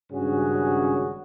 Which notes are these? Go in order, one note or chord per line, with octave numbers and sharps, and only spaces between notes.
G#1 G2 C#3 C#4 F#4 G#4